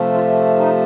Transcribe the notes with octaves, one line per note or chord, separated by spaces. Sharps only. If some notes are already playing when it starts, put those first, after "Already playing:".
Already playing: C3 F3 A3
F4
D#4